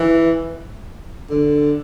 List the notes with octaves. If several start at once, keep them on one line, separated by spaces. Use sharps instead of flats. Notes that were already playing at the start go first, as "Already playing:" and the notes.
Already playing: E3
D3